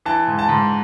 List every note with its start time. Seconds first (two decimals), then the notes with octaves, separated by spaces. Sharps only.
0.06 E3 A5
0.27 G#2
0.39 A5
0.49 G#2